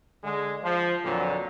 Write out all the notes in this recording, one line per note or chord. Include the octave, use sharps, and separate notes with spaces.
D3 G#3
F3
F2 A#2 D3 F#3